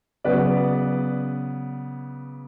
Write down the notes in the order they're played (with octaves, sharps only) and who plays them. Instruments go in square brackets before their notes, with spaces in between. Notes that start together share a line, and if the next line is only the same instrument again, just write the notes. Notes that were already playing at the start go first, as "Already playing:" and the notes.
[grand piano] C#3 F#3 B3 B4 D5